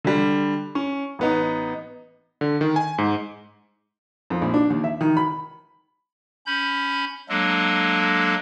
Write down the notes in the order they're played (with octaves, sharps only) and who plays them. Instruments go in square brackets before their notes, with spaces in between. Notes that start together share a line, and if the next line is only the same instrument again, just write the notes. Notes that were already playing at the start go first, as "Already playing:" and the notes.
[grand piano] D3 G3
C#4
A1 B3 D#4
[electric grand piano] D3
D#3
G#5
G#2
[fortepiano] F2
A#1
D4
D#2
E5
D#3
B5
[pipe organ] C#4 B5 G6
F#3 G#3 A#3 D4 A4